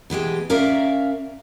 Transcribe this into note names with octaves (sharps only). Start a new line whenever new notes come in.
B2 E3 G#3 G4
C#4 A#4 D5 E5 F5